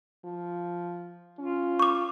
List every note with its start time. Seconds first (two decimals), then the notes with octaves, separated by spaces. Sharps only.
0.25 F3
1.39 C#4 F4
1.80 C#6 D6